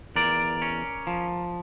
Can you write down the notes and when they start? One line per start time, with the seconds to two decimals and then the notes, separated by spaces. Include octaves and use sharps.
0.16 E2 A#4 D5
0.62 C#4
1.07 F3